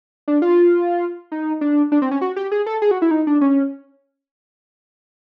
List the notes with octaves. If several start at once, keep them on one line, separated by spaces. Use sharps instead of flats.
D4
F4
D#4
D4
D4
C4
C#4
F#4
G4
G#4
A4
G#4
F#4
E4
D#4
D4
C#4